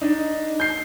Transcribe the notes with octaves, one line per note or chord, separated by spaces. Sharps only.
D4 D#4
G6 C7